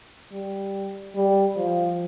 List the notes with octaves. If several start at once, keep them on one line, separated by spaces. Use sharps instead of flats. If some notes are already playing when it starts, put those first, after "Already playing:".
G3
G3
F3